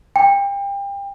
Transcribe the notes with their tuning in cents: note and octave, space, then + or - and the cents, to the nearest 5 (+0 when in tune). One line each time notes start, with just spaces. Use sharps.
G5 +30